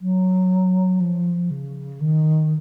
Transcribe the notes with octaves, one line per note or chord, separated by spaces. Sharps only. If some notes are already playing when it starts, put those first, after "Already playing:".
F#3
F3
C#3
D#3